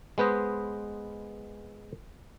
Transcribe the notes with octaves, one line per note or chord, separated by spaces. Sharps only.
G#3 B3 B4 C5 D#5